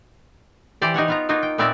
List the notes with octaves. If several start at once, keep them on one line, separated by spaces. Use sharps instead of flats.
E3 G4 C5 D5
D#4 C5 C#5 F#5
B3 F4 A#5
A#3 D#4 F4 F#4
G5
A#2 B3 C4 A#4 D5 E5